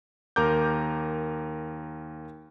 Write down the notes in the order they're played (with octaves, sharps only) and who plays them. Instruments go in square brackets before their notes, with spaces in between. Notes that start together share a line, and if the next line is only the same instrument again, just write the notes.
[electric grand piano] D#2 A#4 A#5 D6 G6